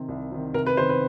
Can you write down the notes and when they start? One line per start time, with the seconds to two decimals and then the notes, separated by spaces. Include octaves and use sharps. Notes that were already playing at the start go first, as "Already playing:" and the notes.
Already playing: C3 D#3
0.08 C2
0.31 C3 D#3
0.54 C2 A#4
0.66 B4
0.77 C3 D#3 C5
0.89 B4